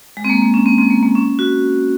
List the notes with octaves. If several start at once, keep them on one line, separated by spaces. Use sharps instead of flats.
G#3
C4
A#3
A#3
C#4
C4
C4
A#3
A#3
C#4
F#4